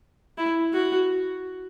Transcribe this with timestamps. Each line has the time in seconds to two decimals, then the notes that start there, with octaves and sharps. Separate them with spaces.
0.38 E4
0.73 F#4